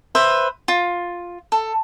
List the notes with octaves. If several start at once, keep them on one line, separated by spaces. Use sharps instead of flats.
B4 C5 E5
F4
A4